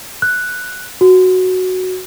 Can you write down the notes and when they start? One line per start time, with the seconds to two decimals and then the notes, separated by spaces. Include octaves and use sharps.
0.22 F#6
1.01 F#4